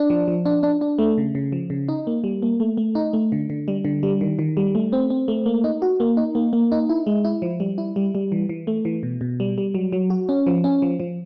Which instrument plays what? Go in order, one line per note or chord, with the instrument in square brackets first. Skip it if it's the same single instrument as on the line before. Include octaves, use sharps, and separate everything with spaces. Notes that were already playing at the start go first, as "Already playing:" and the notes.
Already playing: [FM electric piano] D4
F3
F3
D4
D4
D4
A3
C#3
C#3
F3
C#3
D#4
A#3
G3
A#3
A3
A3
D#4
A3
D3
D3
G3
D3
G3
D#3
D#3
G3
A3
C4
C4
A3
A#3
D#4
F#4
A#3
D#4
A#3
A#3
D#4
E4
G#3
E4
F3
G3
E4
G3
G3
E3
E3
A3
E3
B2
B2
G3
G3
F#3
F#3
F#4
C#4
F3
C#4
F3
F3